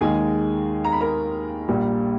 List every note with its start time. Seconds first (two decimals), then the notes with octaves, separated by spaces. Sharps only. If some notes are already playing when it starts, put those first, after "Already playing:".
0.01 D#2 D#3 G#3 G#4 G#5
0.85 A#5
0.92 B5
1.01 A#4 A#5
1.68 A#1 A#2 G3